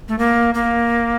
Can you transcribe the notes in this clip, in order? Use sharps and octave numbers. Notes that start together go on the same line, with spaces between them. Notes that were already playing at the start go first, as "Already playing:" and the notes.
A3
A#3
A#3